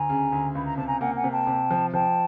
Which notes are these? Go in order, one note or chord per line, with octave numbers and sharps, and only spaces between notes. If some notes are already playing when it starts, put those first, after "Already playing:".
Already playing: D2 G#5 A#5
C#3
D2
C#2 B5
A#5
C3 A5
G#5 A#5
A#3 F#5 G#5
F#5 G#5
C3
G5 A5
C3
F3
F3 G5 A5